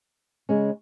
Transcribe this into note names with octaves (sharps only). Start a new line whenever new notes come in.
C#3 G#3 C#4